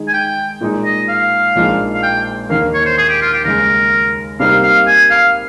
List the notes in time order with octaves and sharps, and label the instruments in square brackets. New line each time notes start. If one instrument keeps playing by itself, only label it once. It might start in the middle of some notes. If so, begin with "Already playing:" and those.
Already playing: [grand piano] D#3 G#3 D#4 G#4
[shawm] G#5
G5
[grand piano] A#2 G#3 D#4
[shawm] D#5
F5
[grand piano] A#1 A#2 G#3 D#4
[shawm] F5
G5
[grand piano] D#2 D#3 A#3 [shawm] F5
[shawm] C#5
C5
G#4
G4
F4
G4
[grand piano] D#2 C#3 G#3 [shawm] A#4
[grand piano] C3 G3 A#3 D#4 [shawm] F5
[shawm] F5
G#5
F5